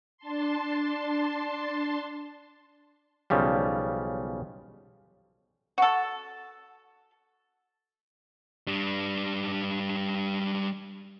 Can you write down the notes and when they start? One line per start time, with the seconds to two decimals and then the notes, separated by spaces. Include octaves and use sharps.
0.17 D4 A5 C6
3.30 B1 C#3 F3 G3
5.78 F#4 A4
8.67 G3 D4